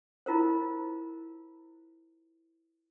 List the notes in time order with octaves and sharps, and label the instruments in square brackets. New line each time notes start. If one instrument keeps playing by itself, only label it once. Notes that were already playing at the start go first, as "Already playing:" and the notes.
[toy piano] E4 F4 A#4 C5